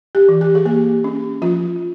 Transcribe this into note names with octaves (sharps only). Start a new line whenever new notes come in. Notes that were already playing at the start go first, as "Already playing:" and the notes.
G4
E3
G4
G#4
A#3 G4
C#4
F3 F4